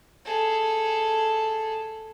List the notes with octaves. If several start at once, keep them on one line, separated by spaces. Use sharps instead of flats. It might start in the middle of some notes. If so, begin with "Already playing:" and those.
G#4 A4